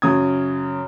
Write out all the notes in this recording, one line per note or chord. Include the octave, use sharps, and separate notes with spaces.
F#2 C#3 D#6 G#6